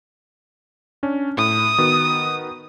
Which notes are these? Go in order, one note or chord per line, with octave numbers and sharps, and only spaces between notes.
C#4 D4
A2 D#6
D#3 B3 F#4